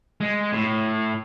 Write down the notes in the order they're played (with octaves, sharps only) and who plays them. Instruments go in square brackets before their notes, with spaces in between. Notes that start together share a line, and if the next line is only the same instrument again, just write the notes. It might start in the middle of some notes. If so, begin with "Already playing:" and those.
[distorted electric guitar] G#3
A2